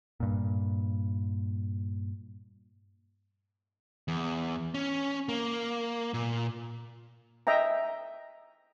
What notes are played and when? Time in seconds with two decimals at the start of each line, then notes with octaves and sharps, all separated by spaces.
0.20 G2 A#2
4.08 E2
4.74 C#4
5.29 A#3
6.14 A#2
7.47 D#5 E5 G5 A#5